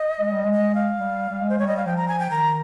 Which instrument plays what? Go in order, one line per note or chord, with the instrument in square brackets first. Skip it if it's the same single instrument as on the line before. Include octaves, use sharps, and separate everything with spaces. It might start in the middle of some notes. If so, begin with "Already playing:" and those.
Already playing: [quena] D#5
[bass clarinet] G#3
G3
G#3
[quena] D#5
F5
[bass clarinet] G3
G3
G#3
[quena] C5
[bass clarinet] G#3 [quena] C#5
[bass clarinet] G3 [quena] D#5
[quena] F5
[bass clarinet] F3 [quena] G5
[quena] A#5
G#5
G5
[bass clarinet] D#3 [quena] A#5